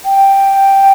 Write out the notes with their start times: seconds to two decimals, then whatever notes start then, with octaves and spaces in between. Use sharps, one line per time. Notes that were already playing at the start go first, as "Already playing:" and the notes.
0.05 G5